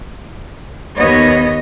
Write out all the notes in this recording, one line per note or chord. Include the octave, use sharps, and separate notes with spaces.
D#2 B3 C#5 D#5